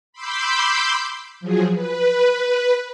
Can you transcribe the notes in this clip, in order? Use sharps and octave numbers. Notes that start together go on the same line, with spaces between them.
B5 C6 D6 E6 G6
F3 F#3 G#4
B4